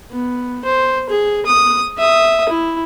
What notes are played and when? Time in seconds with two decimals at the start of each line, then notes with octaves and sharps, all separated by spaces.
0.12 B3
0.65 C5
1.10 G#4
1.46 D#6
1.98 E5 D#6
2.49 E4